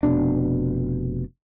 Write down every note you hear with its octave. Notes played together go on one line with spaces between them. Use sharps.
F1 C#2 B2 D4